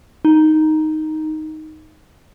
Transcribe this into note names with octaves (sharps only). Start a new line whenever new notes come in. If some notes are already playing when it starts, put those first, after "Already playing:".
D#4